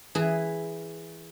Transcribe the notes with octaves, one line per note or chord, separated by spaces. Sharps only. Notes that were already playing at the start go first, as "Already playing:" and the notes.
E3 E4 G#4